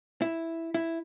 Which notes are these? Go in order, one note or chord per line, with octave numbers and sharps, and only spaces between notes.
E4
E4